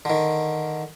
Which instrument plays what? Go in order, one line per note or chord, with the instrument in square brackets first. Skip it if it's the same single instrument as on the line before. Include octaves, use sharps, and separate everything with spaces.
[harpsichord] D3 D#3